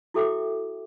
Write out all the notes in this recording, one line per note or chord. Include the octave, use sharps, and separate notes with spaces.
E4 F#4 A4 E5 G5 D6